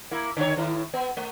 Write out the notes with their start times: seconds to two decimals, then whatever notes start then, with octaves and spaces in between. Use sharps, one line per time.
0.11 A#3 E4
0.37 D3 D#3 C#5
0.56 A2 D#3 E4
0.94 B3
1.17 A3